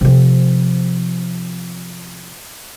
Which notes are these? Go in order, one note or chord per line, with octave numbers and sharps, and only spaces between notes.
C3 F3